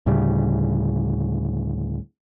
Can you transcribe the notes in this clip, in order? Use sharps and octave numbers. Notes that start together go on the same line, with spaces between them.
D2 A2 C#3 G3